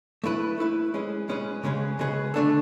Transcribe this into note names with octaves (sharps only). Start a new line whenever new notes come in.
A3 E4 B4
A3 E4 B4
G#3 C#4 G#4 B4
G#3 C#4 G#4 B4
C#3 G#3 C#4 G#4 B4
C#3 G#3 C#4 G#4 B4
D3 A3 D4 A4